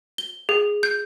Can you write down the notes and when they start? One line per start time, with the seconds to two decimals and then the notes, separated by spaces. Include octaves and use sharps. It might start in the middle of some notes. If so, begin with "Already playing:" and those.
0.18 G7
0.49 G#4
0.83 G6